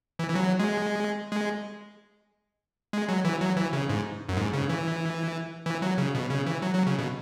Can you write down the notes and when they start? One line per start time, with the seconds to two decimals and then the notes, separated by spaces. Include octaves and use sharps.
0.19 E3
0.30 E3
0.35 F#3
0.60 G#3
1.32 G#3
2.93 G#3
3.09 F#3
3.25 E3
3.41 F#3
3.57 E3
3.73 C#3
3.89 G#2
4.29 F#2
4.37 G#2
4.53 C#3
4.70 E3
5.66 E3
5.82 F#3
5.98 C#3
6.15 B2
6.30 C#3
6.47 E3
6.62 F#3
6.74 F#3
6.87 C#3
6.99 B2